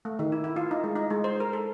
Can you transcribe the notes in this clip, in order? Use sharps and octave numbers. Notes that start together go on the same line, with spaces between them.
A3
D#3
E4
E4
F4
D#4
G#3
D#4
G#3
C5
A#4
A4